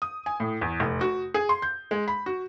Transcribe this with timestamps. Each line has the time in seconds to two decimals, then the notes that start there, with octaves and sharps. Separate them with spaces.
0.02 D#6
0.26 G#5
0.40 A2
0.61 E2
0.80 F1
1.01 F#4
1.34 G#4
1.49 C6
1.62 G6
1.91 G#3
2.08 B5
2.26 F#4